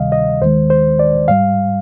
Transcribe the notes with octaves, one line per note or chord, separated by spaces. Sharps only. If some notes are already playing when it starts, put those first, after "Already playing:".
Already playing: D2 C3 D#3 G3 D#5 F5
D#5
D#2 D#3 G#3 C5
C5
D5
G#2 G3 F5